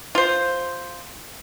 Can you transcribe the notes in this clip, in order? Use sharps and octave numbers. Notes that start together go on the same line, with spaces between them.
F4 C5